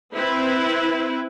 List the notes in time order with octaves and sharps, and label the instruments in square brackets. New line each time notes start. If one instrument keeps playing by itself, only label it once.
[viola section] C4 E4 B4